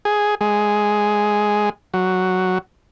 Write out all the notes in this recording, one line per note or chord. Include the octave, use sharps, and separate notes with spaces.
G#4
G#3
F#3